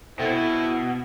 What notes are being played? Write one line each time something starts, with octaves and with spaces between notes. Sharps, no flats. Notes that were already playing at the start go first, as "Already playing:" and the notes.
B2 A3 C4 E4